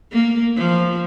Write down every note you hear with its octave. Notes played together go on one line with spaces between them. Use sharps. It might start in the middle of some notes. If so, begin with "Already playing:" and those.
A#3
F3